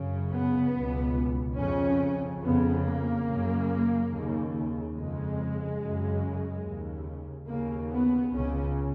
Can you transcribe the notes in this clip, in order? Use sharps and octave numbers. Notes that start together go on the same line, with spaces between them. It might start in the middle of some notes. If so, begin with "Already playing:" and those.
Already playing: F#2 C#3
B3
C#2 B2
F2 C#3 C#4
F2 C#3 B3
A#3
F#2 C#3
D#2 C#3
F2 C#3 G#3
F#2 C#3
D#2 C#3
D#2 C#3 A#3
B3
C#2 C#3 C#4